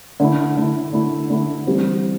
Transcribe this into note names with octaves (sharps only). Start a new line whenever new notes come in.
D3 A3 E4
D3 A3 E4
D3 A3 E4
D3 A3 E4
E3 G3 C4